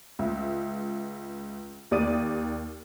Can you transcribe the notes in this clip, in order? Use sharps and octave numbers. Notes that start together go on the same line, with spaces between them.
C#2 E5
D#2 G4 D5 D#6 A6 D#7